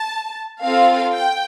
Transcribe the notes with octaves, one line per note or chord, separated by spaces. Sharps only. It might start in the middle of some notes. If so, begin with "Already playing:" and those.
Already playing: A5
C4 F4 A4 F5
G5